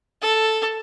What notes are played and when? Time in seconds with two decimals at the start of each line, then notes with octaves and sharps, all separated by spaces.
0.22 A4